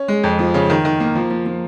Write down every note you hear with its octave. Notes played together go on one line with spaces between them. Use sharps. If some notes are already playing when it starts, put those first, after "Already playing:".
Already playing: C#4
G#3
F2
F3
C#3
D#3
D#3
A#3
F3
F3
F3